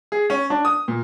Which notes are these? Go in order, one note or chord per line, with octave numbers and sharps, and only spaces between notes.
G#4
C#4
D4
D#6
A#2